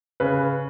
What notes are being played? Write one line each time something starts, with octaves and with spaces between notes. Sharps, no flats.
C#3 B4